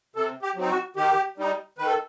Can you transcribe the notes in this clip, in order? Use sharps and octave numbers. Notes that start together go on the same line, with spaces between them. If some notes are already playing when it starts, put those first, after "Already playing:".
C3 A4
G4
F#3 C4 D#4
F#4
D#3 G4
G3 D#4
D#3 B4
A4